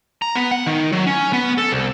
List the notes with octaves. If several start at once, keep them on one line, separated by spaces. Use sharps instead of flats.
A#5
B3
F#5
D#3
F#3
C#4
B3
A4
C2